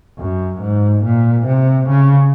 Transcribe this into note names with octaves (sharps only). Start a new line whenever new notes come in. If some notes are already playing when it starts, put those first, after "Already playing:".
F#2
G#2
A#2
C3
C#3